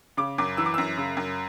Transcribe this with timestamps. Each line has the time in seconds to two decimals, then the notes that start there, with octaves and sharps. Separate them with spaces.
0.17 C#3 D6
0.38 F#2 D6
0.57 E3 E6
0.66 D6
0.74 F#2 E6
0.97 C#3
1.17 F#2